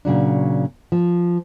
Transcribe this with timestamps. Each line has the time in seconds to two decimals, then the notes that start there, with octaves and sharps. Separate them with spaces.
0.05 A#2 C#3 F#3 D4
0.92 F3